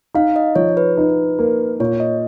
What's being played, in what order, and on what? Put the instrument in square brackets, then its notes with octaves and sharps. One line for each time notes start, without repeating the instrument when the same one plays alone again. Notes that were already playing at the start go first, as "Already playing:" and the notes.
[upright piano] D#4 [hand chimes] F5
[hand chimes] D#5
[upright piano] F3 [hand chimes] C#5
[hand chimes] B4
[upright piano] D#4
A#3
[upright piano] A#2 [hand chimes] C#5
[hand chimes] D#5